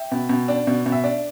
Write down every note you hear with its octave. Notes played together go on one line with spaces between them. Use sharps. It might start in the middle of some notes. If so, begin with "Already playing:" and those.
Already playing: E5 G5
B2
B2
D4
B2
B2
E5
D4